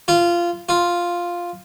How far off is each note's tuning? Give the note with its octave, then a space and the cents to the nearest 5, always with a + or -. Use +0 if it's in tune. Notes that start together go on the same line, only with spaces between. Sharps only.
F4 -15
F4 +0